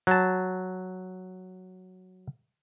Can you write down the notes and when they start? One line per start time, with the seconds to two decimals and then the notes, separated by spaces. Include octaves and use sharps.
0.07 F#3 A5